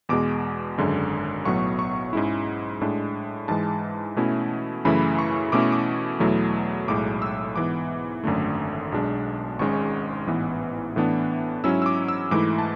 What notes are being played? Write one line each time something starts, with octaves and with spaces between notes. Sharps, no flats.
E2 B2 G#3 D6
G#1 F#2 D3 G#3
B1 A2 F#3 B3 C#6
C#6
G#2 G#3 C#4 E4
A2 G#3 D4
G#2 E3 G#3 A5
B2 A3 C#4 E4
F#2 C#3 E3 A3 E4 B5
C#6
B2 A3 C#4 E4 D6
C#6
D6
E2 B2 F#3 A3 E4
B1 A2 G#3 D6
E6
G#2 E3 B3 D6
G#1 F#2 D3 A3
B1 B2 G#3 D4
G#1 G#2 G#3 C#4 C#6
A1 G#2 E3 B3
A2 E3 B3 D4
G#2 F#3 C#4 E4 E6
E6
D6
E6
G#2 E3 A3 E4 D6
A5